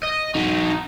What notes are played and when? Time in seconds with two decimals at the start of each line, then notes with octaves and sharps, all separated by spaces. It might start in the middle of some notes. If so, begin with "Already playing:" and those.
0.03 D#5
0.35 D#4 F#4